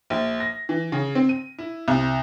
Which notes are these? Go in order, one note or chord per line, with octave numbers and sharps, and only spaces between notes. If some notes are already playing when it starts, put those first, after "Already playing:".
A#1
A#6
E3
C#3
C4
D#7
E4
C2